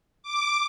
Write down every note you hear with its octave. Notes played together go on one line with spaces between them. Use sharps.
D6